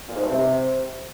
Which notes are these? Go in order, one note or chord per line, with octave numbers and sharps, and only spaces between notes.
A#2
G#2
G2
C3